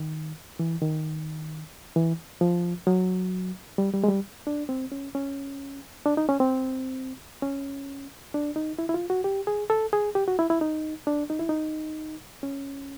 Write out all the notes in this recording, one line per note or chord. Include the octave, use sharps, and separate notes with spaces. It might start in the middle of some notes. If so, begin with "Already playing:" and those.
Already playing: D#3
E3
D#3
E3
F3
F#3
G3
G3
G#3
G3
D4
C4
C#4
C#4
D4
D#4
C#4
C4
C#4
D4
D#4
E4
E4
F4
F#4
G4
G#4
A4
G#4
G4
F#4
E4
E4
D#4
D4
D#4
E4
D#4
C#4